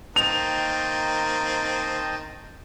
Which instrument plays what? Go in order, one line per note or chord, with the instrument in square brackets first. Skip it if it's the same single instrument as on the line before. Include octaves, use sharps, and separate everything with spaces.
[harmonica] D#3 A#3 C4 [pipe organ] D#5 G5 A5 [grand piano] F7